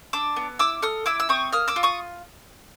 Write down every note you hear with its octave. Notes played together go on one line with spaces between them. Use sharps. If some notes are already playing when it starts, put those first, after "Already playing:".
D4 D6 E6
B3
E4 D6 E6
A4 D#6 F6
E4 D6 E6
E6
C4 C#6 D#6
A#3 D#6 F6
D6 E6
F4
C#6 D#6